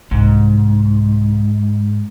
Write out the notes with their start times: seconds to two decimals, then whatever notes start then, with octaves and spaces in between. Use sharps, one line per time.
0.11 C2 G#2